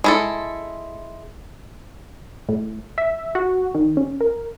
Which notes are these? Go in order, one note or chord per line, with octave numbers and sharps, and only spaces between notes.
G#3 E4 A4
A2
E5
F#4
D#3
C#4
A#4